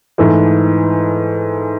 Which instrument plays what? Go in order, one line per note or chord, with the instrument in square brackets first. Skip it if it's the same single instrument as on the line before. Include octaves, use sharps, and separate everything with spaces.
[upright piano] G#2 E3 A3